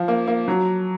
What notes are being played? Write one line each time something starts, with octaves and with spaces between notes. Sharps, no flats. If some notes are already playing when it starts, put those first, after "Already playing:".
Already playing: F3
A#3
A#3
F#3